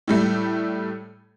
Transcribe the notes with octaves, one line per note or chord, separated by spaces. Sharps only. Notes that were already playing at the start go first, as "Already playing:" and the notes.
A2 G3 A3